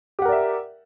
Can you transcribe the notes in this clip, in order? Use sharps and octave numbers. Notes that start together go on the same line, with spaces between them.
G4 A#4 D5 E5 F#5